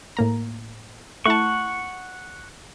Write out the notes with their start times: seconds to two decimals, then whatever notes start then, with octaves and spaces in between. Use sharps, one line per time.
0.17 A2 A#3 A#5
1.26 A3 E4 F#5 A5 C#6